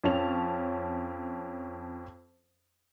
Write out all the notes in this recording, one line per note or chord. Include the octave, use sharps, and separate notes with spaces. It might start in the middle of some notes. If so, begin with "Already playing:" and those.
F2 C#4 A5 F7